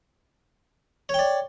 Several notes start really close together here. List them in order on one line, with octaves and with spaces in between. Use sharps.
C#5 G5 D5